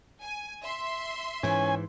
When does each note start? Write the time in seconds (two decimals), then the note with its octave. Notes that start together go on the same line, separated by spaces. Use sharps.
0.22 G#5
0.62 E5 C6
1.43 G#2 E3 C#4 G#5